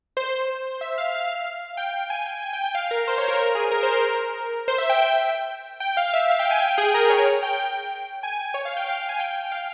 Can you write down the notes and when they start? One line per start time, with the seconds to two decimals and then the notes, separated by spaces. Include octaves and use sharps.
0.17 C5
0.81 E5
0.98 F5
1.14 F5
1.77 G5
2.10 G#5
2.26 G5
2.42 G#5
2.53 G5
2.64 G5
2.75 F5
2.91 A#4
3.07 C5
3.18 C#5
3.28 A#4
3.39 A#4
3.55 G#4
3.72 A#4
3.83 C5
3.92 A#4
4.68 C5
4.78 E5
4.89 G5
5.80 G5
5.97 F5
6.13 E5
6.30 F5
6.39 G5
6.51 G#5
6.62 G5
6.78 G#4
6.94 A#4
7.10 C#5
7.43 G5
7.59 G5
8.23 G#5
8.54 C#5
8.65 F5
8.77 G5
8.87 F5
8.98 G5
9.09 G#5
9.19 G5
9.36 G5
9.46 G5
9.52 F5